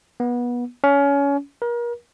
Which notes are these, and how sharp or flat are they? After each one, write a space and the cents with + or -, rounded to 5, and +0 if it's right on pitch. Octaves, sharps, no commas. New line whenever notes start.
B3 -25
C#4 +25
A#4 +35